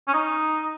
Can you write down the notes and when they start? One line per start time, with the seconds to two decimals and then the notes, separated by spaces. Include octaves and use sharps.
0.08 C#4
0.14 D#4